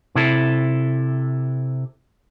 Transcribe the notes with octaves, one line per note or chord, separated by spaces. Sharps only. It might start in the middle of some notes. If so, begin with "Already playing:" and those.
C3 E4 A4